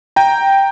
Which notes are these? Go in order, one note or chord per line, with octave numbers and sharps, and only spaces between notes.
G5 A#5